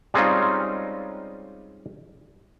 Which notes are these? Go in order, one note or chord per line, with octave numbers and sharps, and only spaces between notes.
G3 G#3 C4 C#4 D#4 F4